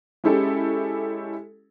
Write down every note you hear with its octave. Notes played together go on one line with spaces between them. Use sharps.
G#3 C#4 E4 G4 A4